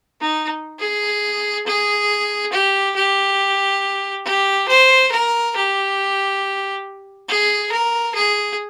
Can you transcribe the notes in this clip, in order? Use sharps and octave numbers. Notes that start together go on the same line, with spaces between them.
D#4
G#4
G#4
G4
G4
G4
C5
A#4
G4
G#4
A#4
G#4